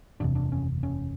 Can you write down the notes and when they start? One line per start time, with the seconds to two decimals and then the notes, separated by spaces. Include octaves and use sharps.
0.20 F#1 E2 C3 D4
0.35 D4
0.52 C#4
0.83 C#4